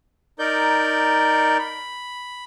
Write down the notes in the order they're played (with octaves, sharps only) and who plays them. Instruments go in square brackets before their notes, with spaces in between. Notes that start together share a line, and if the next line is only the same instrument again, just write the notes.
[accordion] D#4 A#4 D5 G6
B5